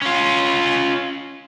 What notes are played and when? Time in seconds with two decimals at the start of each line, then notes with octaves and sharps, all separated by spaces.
0.02 C#4 F4